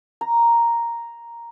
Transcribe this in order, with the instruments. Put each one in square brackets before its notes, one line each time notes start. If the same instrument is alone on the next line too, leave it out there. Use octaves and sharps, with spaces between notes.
[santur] A#5